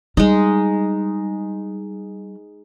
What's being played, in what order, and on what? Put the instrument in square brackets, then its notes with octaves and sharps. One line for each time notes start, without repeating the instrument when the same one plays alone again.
[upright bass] G3 [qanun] G#3 D#4